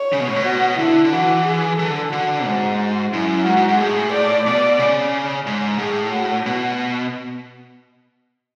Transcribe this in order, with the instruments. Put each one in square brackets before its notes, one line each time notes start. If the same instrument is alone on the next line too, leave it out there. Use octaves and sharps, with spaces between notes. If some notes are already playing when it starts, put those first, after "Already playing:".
Already playing: [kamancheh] C#5
[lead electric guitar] C#3
B2
A2
B2
[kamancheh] F#4
[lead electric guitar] D3 [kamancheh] E4
[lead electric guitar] D3
[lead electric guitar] E3 [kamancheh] F#4
[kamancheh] G#4
[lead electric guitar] E3 [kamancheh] A4
[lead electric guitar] D3
[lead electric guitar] D3 [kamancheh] F#4
[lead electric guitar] G#2 [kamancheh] F#4
[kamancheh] F#4
[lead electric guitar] F#2 [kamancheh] E4
[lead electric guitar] G#2 [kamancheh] F#4
[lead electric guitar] G#2
G#2
[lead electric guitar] A2 [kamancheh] G#4
[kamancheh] D5
[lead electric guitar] B2 [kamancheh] D5
[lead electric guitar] C#3
G#2
[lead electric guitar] A2 [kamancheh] G#4
[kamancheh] F#4
[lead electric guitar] B2 [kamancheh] F#4